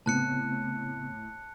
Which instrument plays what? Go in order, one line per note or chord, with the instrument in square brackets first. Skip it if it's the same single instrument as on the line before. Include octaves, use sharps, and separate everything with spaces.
[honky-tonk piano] A2 [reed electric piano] C#3 B3 C4 [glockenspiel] A5 F#6 C#7